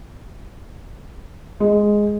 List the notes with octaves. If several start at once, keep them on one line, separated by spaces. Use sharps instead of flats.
G#3